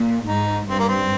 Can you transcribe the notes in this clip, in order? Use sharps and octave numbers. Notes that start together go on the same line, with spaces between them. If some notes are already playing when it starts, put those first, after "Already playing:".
Already playing: A#2
G#2 D#4
G2 C4
A#3
C4